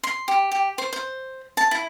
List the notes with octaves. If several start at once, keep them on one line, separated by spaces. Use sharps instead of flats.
C6
G4
G4
C5
C5
A5
E4